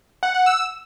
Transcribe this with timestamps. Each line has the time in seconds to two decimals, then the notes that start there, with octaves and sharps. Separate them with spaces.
0.23 F#5
0.34 F#5
0.46 E6